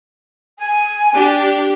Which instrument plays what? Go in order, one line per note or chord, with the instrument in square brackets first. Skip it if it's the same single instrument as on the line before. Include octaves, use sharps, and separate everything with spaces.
[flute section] G#5
[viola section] D4 G4